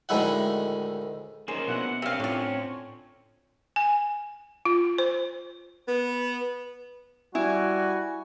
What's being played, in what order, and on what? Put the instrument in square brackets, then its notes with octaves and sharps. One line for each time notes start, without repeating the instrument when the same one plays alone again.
[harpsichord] D2 A2 D#3 G#3 E4 F#5
[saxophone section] D#3 [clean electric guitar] A#3 C#4 C5 [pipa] G#4
[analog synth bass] B2 [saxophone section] D4 E4 F#5
[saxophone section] G2 [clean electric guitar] C4 C#4 [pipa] E5 F5
[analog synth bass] A2 [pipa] D3 F4 [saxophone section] C#5
[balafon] G#5
F4
C5
[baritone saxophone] B3
[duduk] G3 [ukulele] E4 [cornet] F#4 [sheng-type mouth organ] G#5